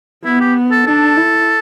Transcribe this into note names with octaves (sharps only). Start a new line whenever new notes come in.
B3 E4
G4
A4
D4 A4
E4